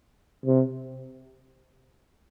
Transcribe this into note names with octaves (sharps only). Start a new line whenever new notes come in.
C3